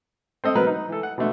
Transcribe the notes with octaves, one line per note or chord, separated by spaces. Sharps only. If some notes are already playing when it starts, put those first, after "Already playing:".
C4 A4 D#5
B2 F#3 B3 A#4 B4
D#4
E3 A4
F#5
B2 D3 A3